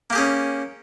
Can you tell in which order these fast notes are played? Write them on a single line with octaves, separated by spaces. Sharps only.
A#3 G4 G#4 C#4